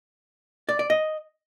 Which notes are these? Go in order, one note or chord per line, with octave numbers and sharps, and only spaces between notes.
D5
D5
D#5